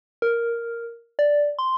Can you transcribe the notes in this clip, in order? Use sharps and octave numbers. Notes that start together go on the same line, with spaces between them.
A#4
D5
C6